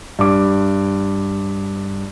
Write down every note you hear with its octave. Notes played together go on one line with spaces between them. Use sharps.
G2 D6